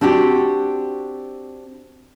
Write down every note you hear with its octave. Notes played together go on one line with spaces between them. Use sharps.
C4 D4 F#4 G4